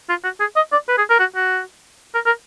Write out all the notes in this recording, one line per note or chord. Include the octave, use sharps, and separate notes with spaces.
F4
F#4
G#4
D#5
D5
B4
G#4
A#4
F#4
F#4
A#4
A#4